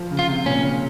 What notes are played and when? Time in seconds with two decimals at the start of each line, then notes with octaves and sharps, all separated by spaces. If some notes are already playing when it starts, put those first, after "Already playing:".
Already playing: F3
0.11 C#3
0.19 F4
0.28 C3
0.46 A#2 C#4
0.63 C#3